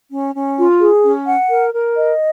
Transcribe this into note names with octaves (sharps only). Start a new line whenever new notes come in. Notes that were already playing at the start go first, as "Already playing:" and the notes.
C#4
C#4
F4
G#4
C#4
F#5
A#4
A#4
D#5